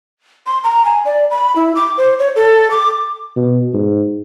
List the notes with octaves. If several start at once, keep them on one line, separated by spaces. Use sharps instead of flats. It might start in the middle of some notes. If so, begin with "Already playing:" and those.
C6
A#5
G#5
D5
B5
E4
D6
C5
C#5
A4
D6
B2
G#2